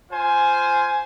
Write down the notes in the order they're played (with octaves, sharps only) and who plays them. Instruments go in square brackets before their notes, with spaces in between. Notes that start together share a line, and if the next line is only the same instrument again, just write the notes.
[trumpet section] F4 C5 G#5